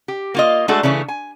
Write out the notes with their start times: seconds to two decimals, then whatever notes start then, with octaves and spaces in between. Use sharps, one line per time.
0.08 G4
0.34 A#3 F4 D#5
0.68 G#3 A3 D4 F#4 G#4 A4
0.83 C#3 E3 A3 C#4
1.08 G#5